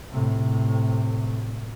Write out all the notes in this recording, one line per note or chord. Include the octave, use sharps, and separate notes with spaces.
A2 C3